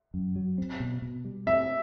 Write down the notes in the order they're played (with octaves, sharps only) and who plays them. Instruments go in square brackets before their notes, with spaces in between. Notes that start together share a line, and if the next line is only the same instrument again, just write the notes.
[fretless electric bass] F#2
F#3
C4
B2
B2
G3
[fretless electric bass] C4 [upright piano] E5